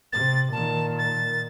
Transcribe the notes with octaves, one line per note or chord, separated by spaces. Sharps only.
C3 A6
A#2 D#3 A5
A6